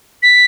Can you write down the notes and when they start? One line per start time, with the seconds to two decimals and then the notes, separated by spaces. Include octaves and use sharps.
0.23 B6